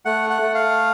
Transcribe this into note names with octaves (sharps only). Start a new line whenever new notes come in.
A3 F#5
F#5
A3
F5